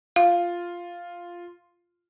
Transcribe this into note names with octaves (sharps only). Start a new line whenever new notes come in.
F4 F5